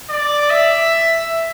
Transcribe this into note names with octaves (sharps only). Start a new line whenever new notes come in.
D5
E5